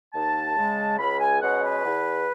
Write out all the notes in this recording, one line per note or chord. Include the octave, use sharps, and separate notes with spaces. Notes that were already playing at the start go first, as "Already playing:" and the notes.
D#2 A5
C#3 G#3
C#2 B5
G#5
B2 G#3 C#4 F#5
B4
E2